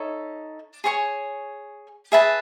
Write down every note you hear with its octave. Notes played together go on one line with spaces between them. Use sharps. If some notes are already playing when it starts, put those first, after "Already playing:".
Already playing: D#4 A4 C#5 E5
G#4 C#5 G#5 C#6
G#4 B4 E5 A5